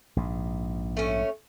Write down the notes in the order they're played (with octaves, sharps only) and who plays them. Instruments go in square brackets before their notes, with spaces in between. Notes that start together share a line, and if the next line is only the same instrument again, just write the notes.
[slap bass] A#1 G#2
[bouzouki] A3 C#4